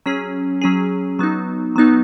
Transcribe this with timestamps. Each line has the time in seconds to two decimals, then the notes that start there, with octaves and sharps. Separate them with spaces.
0.06 F#3 C#4 G#4
0.61 F#3 C#4 G#4
1.19 F#3 B3 D#4
1.76 F#3 B3 D#4